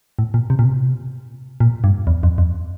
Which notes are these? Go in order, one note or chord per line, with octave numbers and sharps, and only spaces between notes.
A2
A#2
C3
A#2
C3
A#2
G2
E2
F2
F2